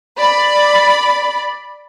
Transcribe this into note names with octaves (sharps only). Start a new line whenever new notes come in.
D5 B5